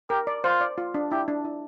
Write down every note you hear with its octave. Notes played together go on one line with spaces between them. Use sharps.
G4 A#4
D5
F4 C5
D5
F4
D4
E4 G4
D4
E4